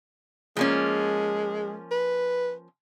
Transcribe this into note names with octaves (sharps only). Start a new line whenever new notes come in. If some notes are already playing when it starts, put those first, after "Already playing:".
F3 G#3 A#3 C#4
B4